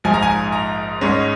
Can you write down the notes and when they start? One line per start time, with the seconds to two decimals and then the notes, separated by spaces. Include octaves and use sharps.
0.04 A#1 G#2 F3 G#5
0.14 A#5
0.22 G#5
0.52 A#5
1.01 G#1 G#2 G#3 C#4